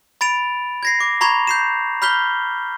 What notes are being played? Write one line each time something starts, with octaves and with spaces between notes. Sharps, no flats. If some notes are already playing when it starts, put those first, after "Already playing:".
B5 A6 D7 F7
G#6 A#6 C7
D6
A#5 B5 C#6 G#6 F7
G6 C7 E7
B5 F6 G6 B6 G7